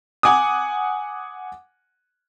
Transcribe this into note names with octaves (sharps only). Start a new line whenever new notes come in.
F#5 G#5 D6 D#6